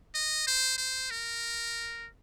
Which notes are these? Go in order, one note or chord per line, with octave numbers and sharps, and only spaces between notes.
D#5
C5
C5
A#4